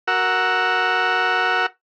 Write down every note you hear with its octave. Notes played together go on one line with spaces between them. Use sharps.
F#4 A#4 F#5 E6